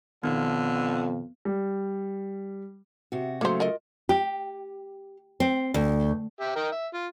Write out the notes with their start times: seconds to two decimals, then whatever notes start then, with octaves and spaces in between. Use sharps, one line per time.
0.24 F2 B2 D3 D#3 B3
1.45 G3
3.12 C3 F#4
3.41 C#3 F#3 A3 A#3 C5
3.60 F4 A#4 D#5
4.09 G4
5.40 C4
5.74 D2
6.40 G4 E5
6.56 D#4 A#4 G5
6.72 E5
6.94 F4